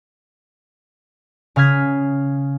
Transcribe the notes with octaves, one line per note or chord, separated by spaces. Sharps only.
C#3 F5 D#6 F6 G#6 B6